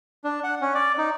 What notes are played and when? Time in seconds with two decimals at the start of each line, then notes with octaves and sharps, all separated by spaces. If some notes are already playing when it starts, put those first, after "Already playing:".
0.24 D4
0.44 F#5
0.61 C#4
0.75 D5
0.98 D#4